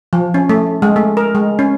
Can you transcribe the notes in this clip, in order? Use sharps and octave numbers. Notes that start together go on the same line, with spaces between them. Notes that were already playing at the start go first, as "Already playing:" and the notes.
F3
C#4
A3
G#3
A3
A#4
G#3
C#4